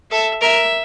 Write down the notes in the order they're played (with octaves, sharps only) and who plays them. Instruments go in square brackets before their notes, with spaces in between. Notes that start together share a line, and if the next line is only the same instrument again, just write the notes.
[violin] A4 [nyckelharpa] E5
[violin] A#4 [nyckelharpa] E5